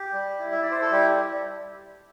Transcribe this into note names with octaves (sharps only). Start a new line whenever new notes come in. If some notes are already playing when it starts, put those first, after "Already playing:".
Already playing: G4
G3
E4
E5
E4 D5
C5
A4
G3 G4